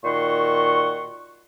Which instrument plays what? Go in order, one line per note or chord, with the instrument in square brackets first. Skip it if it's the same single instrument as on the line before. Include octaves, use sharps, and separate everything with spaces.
[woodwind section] A#2 D#3 F#4 C6 C#6